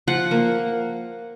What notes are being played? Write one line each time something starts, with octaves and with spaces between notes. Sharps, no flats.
F3 F#5
A#3